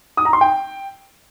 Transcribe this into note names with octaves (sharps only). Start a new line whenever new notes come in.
D#6
A#5
C6
G5